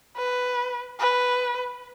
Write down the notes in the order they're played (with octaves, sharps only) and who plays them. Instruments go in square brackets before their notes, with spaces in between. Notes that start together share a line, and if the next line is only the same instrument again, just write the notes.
[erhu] B4
B4